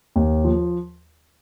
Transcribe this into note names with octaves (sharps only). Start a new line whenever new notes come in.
D#2
F3